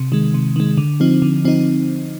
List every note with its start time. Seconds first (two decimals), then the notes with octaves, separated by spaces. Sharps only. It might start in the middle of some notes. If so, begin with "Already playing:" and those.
Already playing: C3
0.12 D#3 G#3
0.34 C3
0.56 D#3 G#3
0.77 D3
1.00 F3 C4 D#4
1.22 D3
1.45 F3 C4 D#4